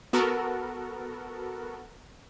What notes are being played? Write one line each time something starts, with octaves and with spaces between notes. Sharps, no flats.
B3 F#4 A4 A#4